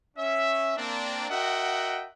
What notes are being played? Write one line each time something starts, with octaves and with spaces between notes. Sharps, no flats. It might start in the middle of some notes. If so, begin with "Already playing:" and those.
C#4 E5
A#3 C4 D4
F#4 A#4 D#5 E5 F#5 G5